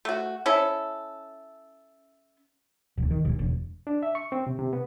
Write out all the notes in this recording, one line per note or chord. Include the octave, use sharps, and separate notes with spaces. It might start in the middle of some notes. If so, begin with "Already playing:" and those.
A3 F#4
C#4 E4 A4
D1
D#3
D#1
E1
D4
E5
C#6
C4
C3
C3
B3